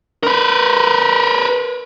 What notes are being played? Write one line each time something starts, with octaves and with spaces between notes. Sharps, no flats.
A#4 B4